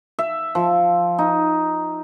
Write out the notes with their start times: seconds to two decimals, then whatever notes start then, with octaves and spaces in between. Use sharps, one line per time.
0.19 E5
0.55 F3
1.19 D#4